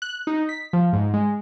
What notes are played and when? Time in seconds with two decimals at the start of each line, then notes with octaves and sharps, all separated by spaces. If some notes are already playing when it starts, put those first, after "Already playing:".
0.02 F#6
0.27 D#4
0.49 B6
0.73 F3
0.93 G#2
1.14 G#3